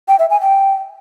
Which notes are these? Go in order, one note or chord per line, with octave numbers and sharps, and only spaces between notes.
G5
E5
G#5
G5